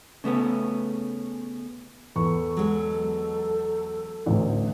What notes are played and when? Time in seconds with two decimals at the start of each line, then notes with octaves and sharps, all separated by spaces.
0.24 C#3 A3 B3 C#4
2.16 E2 A4 C#6
2.57 F#3 G#3 B3
4.26 A1 D2